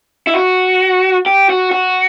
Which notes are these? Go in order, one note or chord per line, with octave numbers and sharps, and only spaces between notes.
E4
F#4
G4
F#4
F#4